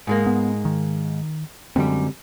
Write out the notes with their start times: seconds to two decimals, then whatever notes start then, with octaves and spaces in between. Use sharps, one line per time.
0.07 G#2 G#3 A#3
0.26 B3
0.65 D#3
1.76 F#2 D3 G3 G#3 C4